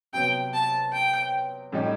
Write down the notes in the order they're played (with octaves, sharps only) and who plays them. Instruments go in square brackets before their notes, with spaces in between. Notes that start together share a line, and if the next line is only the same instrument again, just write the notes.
[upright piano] C3 F#3 B3 [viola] G5
[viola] A5
G5
[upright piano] A2 G3 D#4 G4